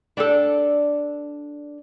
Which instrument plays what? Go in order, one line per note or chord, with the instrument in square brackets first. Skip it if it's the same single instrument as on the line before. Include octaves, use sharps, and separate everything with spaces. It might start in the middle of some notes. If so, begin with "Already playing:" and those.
[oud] D4 G4 A4